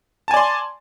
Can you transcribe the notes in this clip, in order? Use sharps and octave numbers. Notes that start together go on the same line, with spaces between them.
D5 G#5 A5 C6